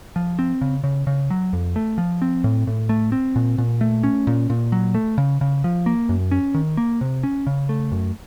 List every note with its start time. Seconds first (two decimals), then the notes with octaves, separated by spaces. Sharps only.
0.16 F3
0.39 C4
0.61 C#3
0.84 C#3
1.07 C#3
1.30 F#3
1.53 F2
1.76 A3
1.98 F3
2.22 C4
2.44 A2
2.67 A2
2.89 A3
3.12 C4
3.36 A#2
3.58 A#2
3.81 A3
4.03 C#4
4.27 A#2
4.50 A#2
4.72 F#3
4.94 A3
5.18 C#3
5.41 C#3
5.64 F3
5.86 A#3
6.09 F#2
6.31 C#4
6.54 D#3
6.77 A#3
7.01 C3
7.23 C#4
7.47 C#3
7.69 A3
7.92 F#2